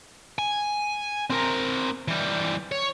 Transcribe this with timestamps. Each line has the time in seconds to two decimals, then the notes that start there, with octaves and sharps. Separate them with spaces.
0.39 G#5
1.30 C4 A#4
2.08 E3 G3
2.72 C#5